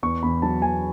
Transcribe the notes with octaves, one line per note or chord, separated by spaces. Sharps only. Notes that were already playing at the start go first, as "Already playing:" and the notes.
E2 C#6
E2 B5
F#3 A5
E2 G#5